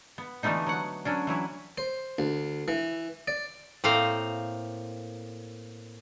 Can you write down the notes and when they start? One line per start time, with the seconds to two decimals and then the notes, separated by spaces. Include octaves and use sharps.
0.18 B3
0.43 D3 E3 G3 A3 B3 D#4
0.66 F#3 F#5
1.05 F#3 C#4 D4
1.27 E3 F#3 E4
1.78 C5
2.19 D2
2.68 E3
3.28 D5
3.84 A2 A#3 C4 F5 A#5